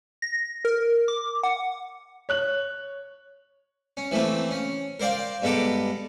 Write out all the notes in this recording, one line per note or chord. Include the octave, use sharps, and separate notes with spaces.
A#6
A#4
D6
F#5
C#5 F#6 F#7
C#4
E3 F3 A3 A#3 C4
C#4
A#4 C5 D5 F5 G5
G2 G#3 B3 A4 A#5 D6